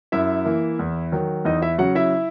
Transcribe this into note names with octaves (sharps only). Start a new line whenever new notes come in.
F#2 E4 E5
E3 A#3
E2
D#3 F#3
E2 D#4 D#5
E4 E5
C#3 F#3 F#4 F#5
E4 E5